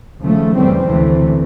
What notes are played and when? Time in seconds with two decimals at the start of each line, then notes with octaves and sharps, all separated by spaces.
0.20 D#2 C#3 F3 A3
0.54 F2 C#3 E3 G3 C4
0.88 D2 C3 E3 A3